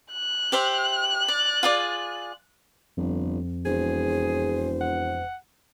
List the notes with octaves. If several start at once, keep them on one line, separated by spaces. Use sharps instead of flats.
F#6
G4 C5 E5
D5
F4 G#4 D5
G1 F2
E1 G#4 C5
F#5